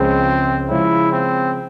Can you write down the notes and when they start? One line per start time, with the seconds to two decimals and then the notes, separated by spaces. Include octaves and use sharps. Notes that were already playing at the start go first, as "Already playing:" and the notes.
Already playing: C#2 C#3 F3 G#3 C4 C#4
0.70 C#3 F3 G#3 C#4 E4
1.13 C4